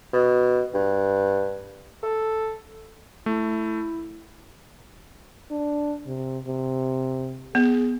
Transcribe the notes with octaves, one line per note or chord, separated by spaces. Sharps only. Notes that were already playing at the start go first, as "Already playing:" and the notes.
B2
G2
A4
A3 E4
D4
C3
C3
B3 G#4